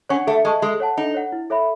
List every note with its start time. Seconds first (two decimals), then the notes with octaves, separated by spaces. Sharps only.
0.09 C#4 C#5 F#5 C#6
0.27 A3 A4
0.44 G#3 D#5 A5 C#6
0.62 G#3 A4
0.80 C#5 F#5 A5
0.97 D#4 A4
1.14 C#5 F#5
1.32 E4
1.50 A4 C#5 E5 B5